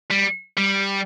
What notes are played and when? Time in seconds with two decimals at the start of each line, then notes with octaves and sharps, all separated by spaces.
0.11 G3
0.57 G3